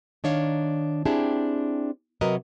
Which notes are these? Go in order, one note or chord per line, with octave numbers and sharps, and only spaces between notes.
D#3 D4 C#5 F5
C4 D4 E4 G4 G#4 A5
C3 F#3 F#4 A#4 B4 D#5